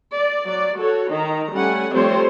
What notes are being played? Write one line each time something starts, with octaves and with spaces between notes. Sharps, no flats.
D5
F#3 D5
F#4 A4 C#5
D#3 D#4 A#5
G3 A3 C#4 F#5 G#5
F3 G3 A3 C4 C5 C#5